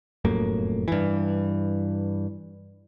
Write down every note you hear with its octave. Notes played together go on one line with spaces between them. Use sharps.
F1 F#2 A2 A#3
G2 E3